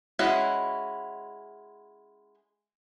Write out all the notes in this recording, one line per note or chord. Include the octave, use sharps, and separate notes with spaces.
G#3 C#4 E4 F#4